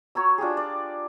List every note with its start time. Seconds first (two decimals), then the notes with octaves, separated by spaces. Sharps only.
0.15 F#4 C#5 A#5 E6
0.38 D4 F4 G4 G#4
0.57 D5